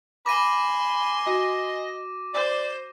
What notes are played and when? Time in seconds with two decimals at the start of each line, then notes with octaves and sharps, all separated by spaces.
0.26 G#5 B5 C6 D6 A#6 D#7
1.27 F#4 D#5
2.34 C5 D5